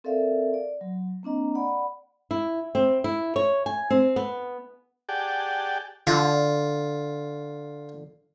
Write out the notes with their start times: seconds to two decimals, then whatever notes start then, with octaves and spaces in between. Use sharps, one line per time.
0.04 C4 A4 A#4 D5 E5 F5
0.54 D5
0.81 F#3
1.23 A#3 C4 D4 D#5 A#5
1.55 D5 F#5 B5
2.31 E4
2.75 C4
3.04 E4
3.36 C#5
3.66 G#5
3.90 C4
4.16 B3
5.09 G4 G#4 D5 F#5 G5 A5
6.07 D3 F4